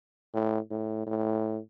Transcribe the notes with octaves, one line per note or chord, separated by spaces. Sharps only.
A2
A2
A2